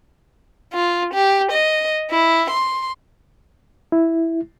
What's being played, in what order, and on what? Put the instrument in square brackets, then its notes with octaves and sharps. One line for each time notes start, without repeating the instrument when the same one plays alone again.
[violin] F4
G4
D#5
E4
C6
[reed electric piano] E4